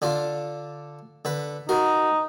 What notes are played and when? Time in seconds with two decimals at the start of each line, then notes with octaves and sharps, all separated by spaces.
0.02 D3 D4 F4
1.25 D3 B4
1.69 D#4 F#4 A#4